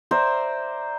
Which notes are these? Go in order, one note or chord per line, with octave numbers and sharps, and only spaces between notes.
C5 D5 E5 A#5